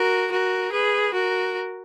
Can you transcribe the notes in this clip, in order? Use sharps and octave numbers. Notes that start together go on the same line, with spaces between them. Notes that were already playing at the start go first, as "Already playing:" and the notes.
Already playing: F#4 A#4
F#4 A#4
G#4 B4
F#4 A#4